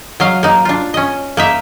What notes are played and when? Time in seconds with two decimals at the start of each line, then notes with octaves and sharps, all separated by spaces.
0.20 F#3 D#5 F5
0.43 A#3 D#4
0.65 D4 F4
0.94 C#4 D#5
1.37 A#3 D#4 E5